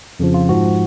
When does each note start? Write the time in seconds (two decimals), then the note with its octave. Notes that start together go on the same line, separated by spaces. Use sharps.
0.20 F2 C#3 F3
0.34 F4
0.49 G#2 F3 F#4